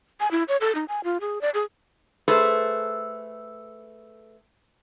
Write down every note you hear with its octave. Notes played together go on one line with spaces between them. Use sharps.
G#5
E4
C#5
A4
D#4
G#5
F4
G#4
D5
G#4
A3 G#4 A4 B4 C5